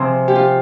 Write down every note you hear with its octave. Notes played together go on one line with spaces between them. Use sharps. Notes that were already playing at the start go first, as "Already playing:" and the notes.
Already playing: C3 F3 C4 G#4
G4
F4